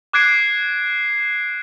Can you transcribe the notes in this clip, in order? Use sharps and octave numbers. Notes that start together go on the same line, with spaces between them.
D6 F#6 G#6 C7 D7